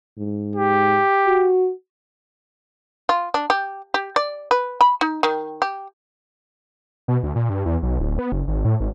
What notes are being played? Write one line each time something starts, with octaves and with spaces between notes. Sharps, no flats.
G#2
G4
F#4
F4
D4
G4
G4
D5
B4
B5
D#4
D#3
G4
B2
D2
A#2
G2
E2
B1
D1
B3
F#1
G#1
A2
G#1